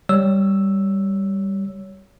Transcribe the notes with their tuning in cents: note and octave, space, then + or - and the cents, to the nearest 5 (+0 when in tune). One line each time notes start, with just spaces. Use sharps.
G3 +0 C#5 +10 E6 +0